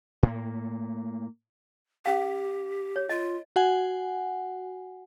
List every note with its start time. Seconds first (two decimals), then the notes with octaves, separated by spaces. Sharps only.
0.23 A2 A#3
2.06 C#4 G4 F5
2.96 C#5
3.09 F4 D#5
3.56 F#4 F#5 G#5